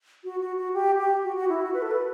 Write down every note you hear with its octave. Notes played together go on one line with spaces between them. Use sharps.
F#4
F#4
F#4
G4
G4
F#4
F#4
E4
F#4
B4
A4
B4